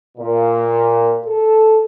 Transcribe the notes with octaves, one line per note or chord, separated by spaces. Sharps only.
A#2
A4